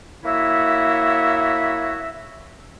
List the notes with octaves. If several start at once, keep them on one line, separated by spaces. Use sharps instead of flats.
A#3 E4 F#4 C#5 E5